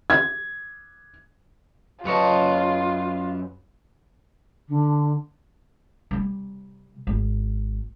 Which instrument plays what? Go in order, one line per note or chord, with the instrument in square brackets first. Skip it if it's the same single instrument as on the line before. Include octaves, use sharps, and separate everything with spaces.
[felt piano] G#6
[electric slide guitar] F#2 A5 [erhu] F4 [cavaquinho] B4 C#5 D#5
[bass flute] D3
[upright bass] C3 G3
G#1